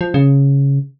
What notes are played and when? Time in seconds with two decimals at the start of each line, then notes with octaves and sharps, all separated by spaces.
0.01 F3
0.14 C#3